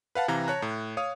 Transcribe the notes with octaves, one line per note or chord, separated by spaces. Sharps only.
B4 F5 F#5 A5
C3 E3 F5 A#5
C#5 A5 A#5 F#6
A2
C#5 F5 D#6